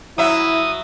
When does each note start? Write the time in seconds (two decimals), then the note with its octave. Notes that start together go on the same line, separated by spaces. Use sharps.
0.18 F#3 E4 E5 D#6